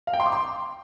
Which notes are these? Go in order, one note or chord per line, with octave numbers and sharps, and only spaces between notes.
F5
G5
C6
D6
C6